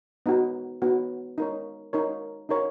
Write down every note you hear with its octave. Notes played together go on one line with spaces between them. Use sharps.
B3 D#4 F#4
B3 D#4 F#4
D#4 A#4 C#5
D#4 A#4 C#5
D#4 A#4 C#5